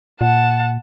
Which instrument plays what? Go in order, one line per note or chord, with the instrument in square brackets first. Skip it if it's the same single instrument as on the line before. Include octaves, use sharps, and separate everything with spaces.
[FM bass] A#2 [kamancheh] F#5 A5